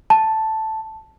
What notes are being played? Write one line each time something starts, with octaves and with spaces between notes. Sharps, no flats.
A5